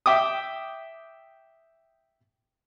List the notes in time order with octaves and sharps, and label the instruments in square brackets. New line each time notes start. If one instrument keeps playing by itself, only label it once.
[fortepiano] E5 G5 D6 D#6